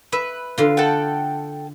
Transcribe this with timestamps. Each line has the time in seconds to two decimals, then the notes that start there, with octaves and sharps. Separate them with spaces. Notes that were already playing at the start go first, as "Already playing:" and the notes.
0.12 B4 E5
0.58 D3 F4
0.77 A4 F#5 G5